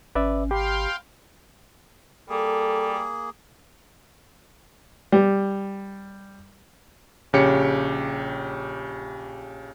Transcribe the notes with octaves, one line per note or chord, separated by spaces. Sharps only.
G#1 C#4 B4 D5 E5
G4 F5 G5 B5 C6
G3 A#3 G#4 A4
G3
A#1 C#3 G4 C#5 C#7